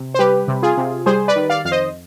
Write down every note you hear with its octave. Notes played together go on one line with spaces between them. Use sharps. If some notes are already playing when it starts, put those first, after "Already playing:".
Already playing: C3
C5
G3 G4 B4
C3
F4 G#4
C3
G3 G#4 C5
B4 D5
D#3
D5 F5
F2 F5
C5 D#5